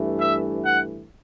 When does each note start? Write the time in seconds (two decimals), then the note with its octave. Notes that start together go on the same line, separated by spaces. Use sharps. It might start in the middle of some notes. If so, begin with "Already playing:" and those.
Already playing: G2 E3 A3
0.20 E5
0.65 F#5